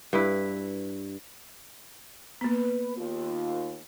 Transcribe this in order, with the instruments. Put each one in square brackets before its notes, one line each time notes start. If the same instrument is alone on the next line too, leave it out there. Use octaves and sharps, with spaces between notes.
[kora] G2 E4 B4
[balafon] A#3 B3 [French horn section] B4
[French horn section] D#2 F4